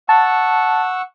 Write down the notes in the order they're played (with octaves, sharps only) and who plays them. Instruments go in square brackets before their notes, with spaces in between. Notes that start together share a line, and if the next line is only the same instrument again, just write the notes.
[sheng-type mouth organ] F#5 C#6 E6 [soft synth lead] A5